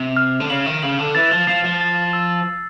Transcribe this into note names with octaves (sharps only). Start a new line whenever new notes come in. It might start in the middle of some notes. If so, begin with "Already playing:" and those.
Already playing: C3
F6
D3
C#3 F#7
D#3
C#3 F#7
D3
E3 A6
F3
F3 C7
F3
A6
E6